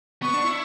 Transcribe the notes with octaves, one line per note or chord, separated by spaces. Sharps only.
B3 C#6
D4
E4